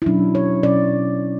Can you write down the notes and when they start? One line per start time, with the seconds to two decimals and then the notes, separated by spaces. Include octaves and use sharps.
0.02 E4
0.06 B2 F#3 C#4 D4
0.35 C#5
0.63 B2 F#3 C#4 D5